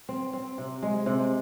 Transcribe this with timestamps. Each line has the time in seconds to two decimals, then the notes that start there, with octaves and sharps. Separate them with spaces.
0.09 C4
0.33 C4
0.58 C3
0.83 G#3
1.06 C3